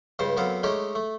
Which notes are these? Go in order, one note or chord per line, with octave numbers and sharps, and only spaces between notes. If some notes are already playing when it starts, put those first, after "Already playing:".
C#2 G2 C5 A5
F#2 B3 C4 A4 F5
G#3 A3 C#4 D#4 G4
A3